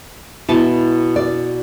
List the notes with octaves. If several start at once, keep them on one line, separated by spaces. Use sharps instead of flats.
B2 E4 A5
D5